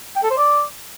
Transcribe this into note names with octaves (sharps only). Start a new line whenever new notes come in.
G5
A4
C5
D5